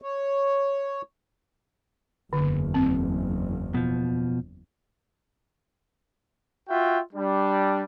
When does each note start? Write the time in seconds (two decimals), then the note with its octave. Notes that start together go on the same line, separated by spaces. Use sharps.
0.02 C#5
2.33 F#1 E2 D3
2.74 C4
3.75 B2 F3
6.69 F4 F#4 E5 G5
7.14 G3 D4